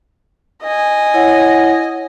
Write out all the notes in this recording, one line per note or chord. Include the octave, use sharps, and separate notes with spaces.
D#5 G#5
E4 C#5 F#5